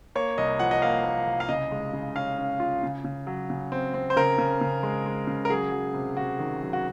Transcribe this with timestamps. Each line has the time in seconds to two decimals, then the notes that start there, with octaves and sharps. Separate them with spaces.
0.15 A#3 C#5
0.38 C2 D#5
0.59 F3 F#5
0.71 D#5
0.82 A#3 F5
1.04 A#3
1.27 C2
1.40 F5
1.49 C#3 D#5
1.72 G#3
1.93 C#3
2.16 C#4 F5
2.38 C#4
2.60 F4
2.83 C#3
3.05 C#3
3.27 F#3
3.50 C#3
3.72 C4
3.94 C4
4.10 C5
4.16 C#3 A#4
4.38 C#3
4.61 C#3
4.83 G#3
5.06 G#3
5.27 C#3
5.45 A#4
5.50 F#3 G#4
5.72 F#3
5.94 C3
6.17 C3 F#4
6.39 D#3
6.62 F#3
6.73 F#4